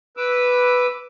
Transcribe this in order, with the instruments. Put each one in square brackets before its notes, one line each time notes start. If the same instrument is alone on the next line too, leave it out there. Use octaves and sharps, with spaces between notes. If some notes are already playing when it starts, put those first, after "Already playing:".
[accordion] B4 D6 E6